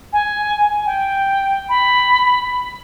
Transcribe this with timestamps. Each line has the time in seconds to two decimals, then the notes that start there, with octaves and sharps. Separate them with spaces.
0.13 G#5
0.86 G5
1.69 B5